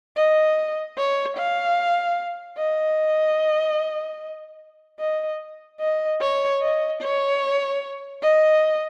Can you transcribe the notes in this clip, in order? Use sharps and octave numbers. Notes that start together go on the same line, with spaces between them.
D#5
C#5
F5
D#5
D#5
D#5
C#5
D#5
C#5
D#5